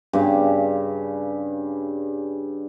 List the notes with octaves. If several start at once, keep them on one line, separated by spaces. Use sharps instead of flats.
G2 C#3